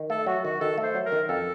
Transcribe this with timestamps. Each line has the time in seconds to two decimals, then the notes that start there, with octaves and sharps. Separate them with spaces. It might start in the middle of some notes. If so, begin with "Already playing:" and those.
Already playing: D#3
0.10 A3 A4
0.26 F#3 F#4
0.45 D#3 F#4
0.61 D#3 A4
0.78 A3
0.83 C5
0.95 F#3
1.06 A#4
1.12 D#3
1.29 F2 A4